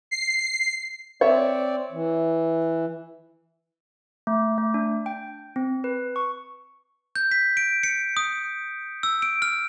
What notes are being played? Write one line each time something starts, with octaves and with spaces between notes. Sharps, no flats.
C7
C4 C#5 D5 E5
E3
A3
A3
D4
G5
C4
B4
C#6
G6
B6
D7
C#7
D#6
E6
D7
F6